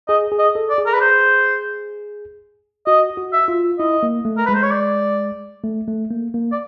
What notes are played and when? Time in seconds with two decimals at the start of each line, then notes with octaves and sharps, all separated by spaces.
0.08 G#4 D#5
0.32 G#4
0.39 D#5
0.55 A4
0.70 D5
0.78 G#4
0.86 A#4
0.94 B4
1.01 C5
2.87 F#4 D#5
3.17 F#4
3.33 E5
3.48 F4
3.79 E4 D#5
4.03 A#3
4.25 A3
4.38 A#4
4.46 G#3 B4
4.55 C5
4.63 C#5
4.71 D5
5.64 A3
5.88 A3
6.11 A#3
6.34 A#3
6.52 D5